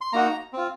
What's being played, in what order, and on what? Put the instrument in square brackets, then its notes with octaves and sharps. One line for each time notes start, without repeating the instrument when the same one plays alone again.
[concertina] C6
A#3 D#4 F#4 A#5
C4 F4